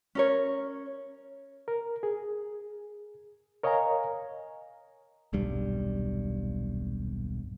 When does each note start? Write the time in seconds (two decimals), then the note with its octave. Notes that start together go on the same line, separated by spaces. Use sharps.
0.15 C#4 A#4 C#5
1.68 A#4
2.03 G#4
3.63 A#4 C#5 D#5 F5 G#5 A#5
5.33 D#1 B1 G2 G3